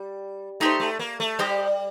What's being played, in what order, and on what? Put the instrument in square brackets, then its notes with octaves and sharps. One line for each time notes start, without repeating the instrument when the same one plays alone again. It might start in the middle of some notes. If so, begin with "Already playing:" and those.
Already playing: [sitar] G3
[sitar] A3 [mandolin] D#4 G4 C5
[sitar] A3
A#3
A3
[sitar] G3 [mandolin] D#4 G4 C5